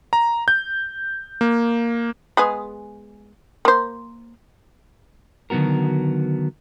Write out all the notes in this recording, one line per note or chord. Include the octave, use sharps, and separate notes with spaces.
A#5
G6
A#3
G#3 B3 G#4
A#3 C5
D3 D#3 F#3 B3 F#4 A#4